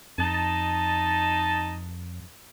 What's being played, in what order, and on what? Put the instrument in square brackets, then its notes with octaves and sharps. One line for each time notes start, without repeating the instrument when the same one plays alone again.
[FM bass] F2 [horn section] D#4 D#5 A5